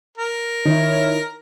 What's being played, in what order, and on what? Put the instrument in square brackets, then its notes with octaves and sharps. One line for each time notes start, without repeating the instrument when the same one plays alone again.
[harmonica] A#4
[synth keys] D#3 D#4 [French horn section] E4 C#5